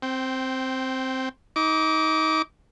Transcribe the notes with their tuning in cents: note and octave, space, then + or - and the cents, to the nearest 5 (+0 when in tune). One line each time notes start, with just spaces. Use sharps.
C4 +5 G5 -15
D#4 +25 D6 -20